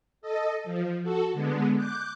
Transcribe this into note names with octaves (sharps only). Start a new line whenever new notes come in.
A4 D#5
F3
F#4 A4
D3 G#3 B3
D6 F#6 G6